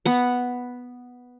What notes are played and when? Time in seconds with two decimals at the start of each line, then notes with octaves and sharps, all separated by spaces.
0.05 B3 F#5